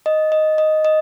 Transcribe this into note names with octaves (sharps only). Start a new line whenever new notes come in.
D#5
D#5
D#5
D#5